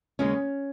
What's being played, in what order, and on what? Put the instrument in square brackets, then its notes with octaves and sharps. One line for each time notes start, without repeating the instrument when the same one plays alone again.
[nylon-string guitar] D#2 C#3 G#3 C#4